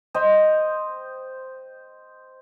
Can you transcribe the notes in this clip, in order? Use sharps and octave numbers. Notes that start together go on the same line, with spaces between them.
C5 D#5 G5